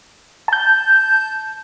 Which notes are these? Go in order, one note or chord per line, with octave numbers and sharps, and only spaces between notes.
A5 G6